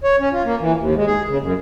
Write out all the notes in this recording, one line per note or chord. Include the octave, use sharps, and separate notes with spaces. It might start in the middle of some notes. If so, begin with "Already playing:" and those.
C#5
C#4
F4
A#3
E3
D#2
G#3
G#4
C#3
F#2